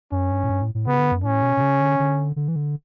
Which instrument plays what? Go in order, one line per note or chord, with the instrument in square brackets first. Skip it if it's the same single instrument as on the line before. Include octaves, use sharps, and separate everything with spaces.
[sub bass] F#2 [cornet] C#4
[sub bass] G2
A2
G2
A2
A2
[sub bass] C#3 [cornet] B3
[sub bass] D3
F#2
[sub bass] A2 [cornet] C#4
[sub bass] B2
B2
C#3
D3
D3
D3
E3
D3